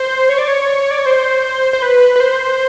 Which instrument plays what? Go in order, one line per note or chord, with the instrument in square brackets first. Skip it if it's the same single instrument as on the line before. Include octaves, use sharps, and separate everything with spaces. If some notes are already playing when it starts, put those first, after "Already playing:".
Already playing: [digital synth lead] C5
C#5
D5
C#5
D5
C#5
C5
C5
B4
B4
C5